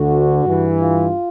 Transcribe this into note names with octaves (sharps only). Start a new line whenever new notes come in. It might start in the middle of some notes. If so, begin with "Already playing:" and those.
Already playing: D2 D3 F#4
G2 E3
F4